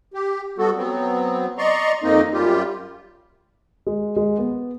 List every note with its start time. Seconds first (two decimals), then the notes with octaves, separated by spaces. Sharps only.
0.14 G4
0.58 G3 B3 F#4 A4
0.76 F#3 B3 C4
1.58 D5 D#5 A#5 C6 C#6
2.03 F2 D#3 A#3 C4 D#4 D#5
2.33 F#2 G3 F4 G4
3.87 G#3
4.16 G#3
4.39 B3